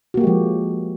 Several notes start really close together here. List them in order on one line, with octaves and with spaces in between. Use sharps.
F#4 A#3 G4 G#3 F3